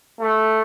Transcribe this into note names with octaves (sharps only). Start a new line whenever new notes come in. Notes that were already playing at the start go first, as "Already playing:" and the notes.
A3